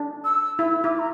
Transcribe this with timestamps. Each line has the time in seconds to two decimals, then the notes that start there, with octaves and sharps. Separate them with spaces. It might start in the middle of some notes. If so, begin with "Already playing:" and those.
Already playing: D4
0.24 E6
0.59 E4 E6
0.84 E4 D6
0.99 A#5